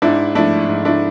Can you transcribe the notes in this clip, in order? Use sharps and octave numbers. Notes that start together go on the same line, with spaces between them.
G#2 D4 E4
F3 A3 D4 E4
G#2
D4 E4